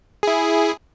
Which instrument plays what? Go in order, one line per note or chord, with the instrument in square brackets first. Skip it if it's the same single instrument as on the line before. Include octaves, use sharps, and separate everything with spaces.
[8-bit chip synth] E4 G#4